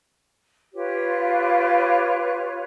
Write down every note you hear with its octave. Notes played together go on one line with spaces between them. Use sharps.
F4 G4 B4 C#5